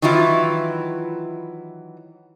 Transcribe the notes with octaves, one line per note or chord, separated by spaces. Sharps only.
D#3 E3 F#3 E4 F4